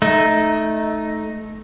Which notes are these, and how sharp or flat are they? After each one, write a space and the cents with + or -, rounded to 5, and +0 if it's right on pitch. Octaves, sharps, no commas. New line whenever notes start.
A3 -10 D#4 +0